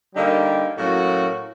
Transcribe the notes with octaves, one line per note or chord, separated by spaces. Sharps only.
D3 G3 A#3 D#4 G4
A2 F#3 A#3 C#4 F#4